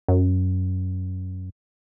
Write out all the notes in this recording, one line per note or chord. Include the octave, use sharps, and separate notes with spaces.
F#2